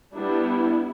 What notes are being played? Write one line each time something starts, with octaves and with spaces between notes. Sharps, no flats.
G3 B3 D4 E4